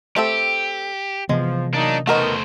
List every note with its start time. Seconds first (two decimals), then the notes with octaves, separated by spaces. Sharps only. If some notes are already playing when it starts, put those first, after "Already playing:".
0.16 A3 C4 G4 A4
1.29 C3 E3 F3 G#3 B3
1.74 F#3 A#3 D4 D#4
2.07 B2 D#3 A3 F#4 A#4 C5 D#5